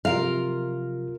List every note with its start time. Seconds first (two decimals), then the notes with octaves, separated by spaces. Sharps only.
0.05 C3 F3 F#3 F4 A#4 F5